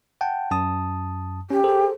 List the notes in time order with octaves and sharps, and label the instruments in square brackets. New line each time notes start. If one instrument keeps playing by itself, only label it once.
[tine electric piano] F#5 G5 A5
F#2 A5 D#6
[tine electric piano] C#4 [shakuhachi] G4
[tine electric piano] G#4 A4 C5